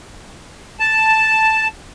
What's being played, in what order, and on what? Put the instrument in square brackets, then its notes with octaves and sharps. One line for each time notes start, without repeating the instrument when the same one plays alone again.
[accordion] A5